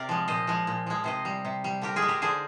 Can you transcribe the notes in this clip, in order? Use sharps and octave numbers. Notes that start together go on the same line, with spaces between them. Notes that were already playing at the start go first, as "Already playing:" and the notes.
Already playing: C3 A#4 D5
F3 G#3
A#2 C5 D#5
F3 G#3
A#2
F3 G#3
C3 C5 D#5
G3
C3
G3
D3 G4 A#4
F4 G#4
G#3
G4 A#4
D3 G#4 C5